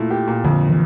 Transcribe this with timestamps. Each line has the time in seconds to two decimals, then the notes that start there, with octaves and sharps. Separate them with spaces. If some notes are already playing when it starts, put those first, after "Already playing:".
Already playing: A#2 A3 E4
0.10 G4
0.28 A#2
0.45 F2 D3
0.69 E3